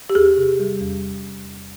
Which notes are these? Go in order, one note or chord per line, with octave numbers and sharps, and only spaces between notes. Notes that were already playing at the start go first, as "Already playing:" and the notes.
G4
E2 G#4
C3
G3
E2